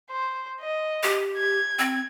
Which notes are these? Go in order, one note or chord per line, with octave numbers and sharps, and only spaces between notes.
C5
D#5
G4
G#6
C4